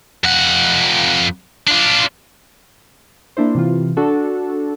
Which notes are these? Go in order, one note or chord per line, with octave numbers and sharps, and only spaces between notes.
F2 F#5
D4 F4
A#3 D4 E4 C5
C3 E3 F4
D4 F#4 A4